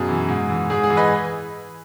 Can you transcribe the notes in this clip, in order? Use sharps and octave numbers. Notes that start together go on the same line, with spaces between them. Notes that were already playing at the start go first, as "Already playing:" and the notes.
Already playing: F#2 B2 G#4
E3
G#2
E3
G#2 G#4
G#4
E3
B4 D#5